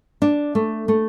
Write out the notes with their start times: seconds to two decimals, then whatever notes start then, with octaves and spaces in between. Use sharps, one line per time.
0.22 D4
0.55 A3
0.88 A3